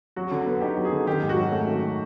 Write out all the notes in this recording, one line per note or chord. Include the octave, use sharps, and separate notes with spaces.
F#3 F#4
D3
B3
D#4 G4
F#3
G#4
D3
D#3 G4
G#2
F#4
F#3
A3
D#3